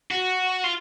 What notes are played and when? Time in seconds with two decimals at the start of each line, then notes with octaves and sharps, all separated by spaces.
0.11 F#4
0.64 F4